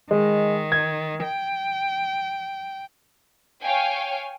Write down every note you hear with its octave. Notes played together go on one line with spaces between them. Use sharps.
D#3 G#3
G#6
G5
C#5 F5 G5 G#5